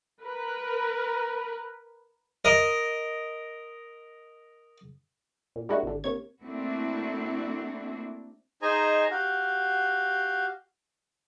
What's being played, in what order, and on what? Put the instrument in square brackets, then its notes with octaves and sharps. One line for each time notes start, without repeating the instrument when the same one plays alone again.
[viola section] A#4 B4
[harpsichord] A#4 D#5
[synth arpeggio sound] A#2
G3 G#3 A#3 D4 E4 F#4
G#1 D3
C3 A#3 C#5 G#6
[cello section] A3 A#3 C4 D4 E4 F#4
[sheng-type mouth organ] D#4 G#4 C5 D#5 G#5 A#5
F#4 G4 F5